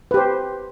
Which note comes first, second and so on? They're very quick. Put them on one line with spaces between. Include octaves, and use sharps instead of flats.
B4 G4 C5